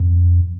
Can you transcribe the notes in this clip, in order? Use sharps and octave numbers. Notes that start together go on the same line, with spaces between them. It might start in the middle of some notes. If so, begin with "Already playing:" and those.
Already playing: F2